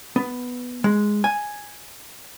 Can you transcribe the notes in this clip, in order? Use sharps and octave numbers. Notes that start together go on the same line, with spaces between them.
B3
G#3
G#5